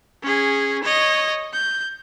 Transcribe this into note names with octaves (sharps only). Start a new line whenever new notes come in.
C#4 G#4
C#5 D#5
G6